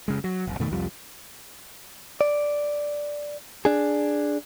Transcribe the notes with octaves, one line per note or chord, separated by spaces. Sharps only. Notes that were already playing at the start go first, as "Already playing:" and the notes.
F#1 C#3 G#3
F#3
F1 C2
F2 B2 D#3 A3
C2 F2 F3 G3
D5
D4 G#4